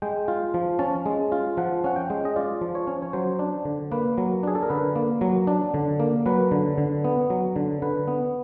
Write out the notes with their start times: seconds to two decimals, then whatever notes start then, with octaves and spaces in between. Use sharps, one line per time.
0.02 G#3 G5
0.28 F4
0.54 F3
0.79 C#4 A5
1.06 G#3
1.32 F4
1.57 F3 F#5
1.84 C#4 F#5
1.96 G5
2.10 G#3
2.25 D#5
2.36 F4 D5
2.61 F3
2.75 C#5
2.87 C#4
3.02 C#5
3.13 F#3 C5
3.39 D4
3.65 D3
3.92 A#3 B4
4.18 F#3
4.43 D4 G#4
4.55 A4
4.63 A#4
4.70 D3 B4
4.95 A#3
5.21 F#3
5.47 D4
5.74 D3
6.00 A#3
6.26 F#3 B4
6.51 D3
6.78 D3
7.04 B3
7.30 F#3
7.56 D3
7.82 D3 B4
8.08 B3